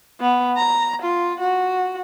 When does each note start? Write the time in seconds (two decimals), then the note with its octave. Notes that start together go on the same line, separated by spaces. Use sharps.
0.20 B3
0.57 A#5
1.01 F4
1.39 F#4